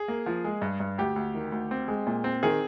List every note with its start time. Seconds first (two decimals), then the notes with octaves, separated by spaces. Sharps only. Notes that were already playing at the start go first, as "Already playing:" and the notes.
Already playing: G#4
0.08 A#3
0.26 F3
0.44 G#3
0.62 G2
0.80 G2
0.98 D2 G4
1.16 D2
1.34 D#3
1.52 D2
1.71 C4
1.88 G#3
2.07 A#2
2.24 C4
2.43 D#3 G#4